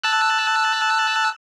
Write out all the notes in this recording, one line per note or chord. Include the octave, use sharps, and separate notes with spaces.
A5 E6 F#6